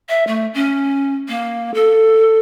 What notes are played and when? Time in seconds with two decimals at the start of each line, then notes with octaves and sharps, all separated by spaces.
0.09 E5
0.27 A3
0.54 C#4
1.29 A#3
1.74 A4